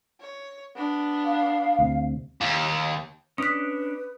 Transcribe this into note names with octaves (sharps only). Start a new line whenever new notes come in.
C#5
B3 D4
F5
D2 C3
D#2
C#4 D4 B4 D#6 F#6 B6